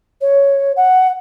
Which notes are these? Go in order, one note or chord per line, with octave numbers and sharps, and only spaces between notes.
C#5
F#5